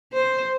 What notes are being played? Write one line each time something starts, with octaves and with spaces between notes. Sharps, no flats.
C5